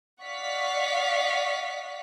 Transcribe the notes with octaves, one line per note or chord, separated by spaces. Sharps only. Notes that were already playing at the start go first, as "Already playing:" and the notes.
D5 D#5 F5 F#5 C#6 B6